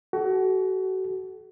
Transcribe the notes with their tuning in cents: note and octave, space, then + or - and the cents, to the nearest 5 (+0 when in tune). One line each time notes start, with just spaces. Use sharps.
F#4 +30 A4 -45